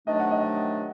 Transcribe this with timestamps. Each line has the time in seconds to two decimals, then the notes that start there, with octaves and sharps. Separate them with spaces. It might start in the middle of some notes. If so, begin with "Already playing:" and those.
0.07 C3 D#3 F#3 A3 D4 D#5
0.20 F#5
0.31 D#5